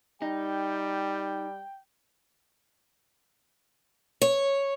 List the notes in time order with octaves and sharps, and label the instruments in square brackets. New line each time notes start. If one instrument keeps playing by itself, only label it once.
[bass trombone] G3 [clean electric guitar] D#4 [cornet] G5
[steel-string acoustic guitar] C#5